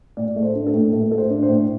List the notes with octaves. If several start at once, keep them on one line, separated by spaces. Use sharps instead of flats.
A2 D5
A3
C5
D4
A4
A2
A2 A4
A3 A4
C5
D4
C5
A2